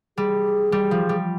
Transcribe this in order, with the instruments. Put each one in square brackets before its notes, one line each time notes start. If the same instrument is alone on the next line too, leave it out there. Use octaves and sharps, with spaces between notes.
[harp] G3 [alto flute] G#4
[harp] G3
F3
G3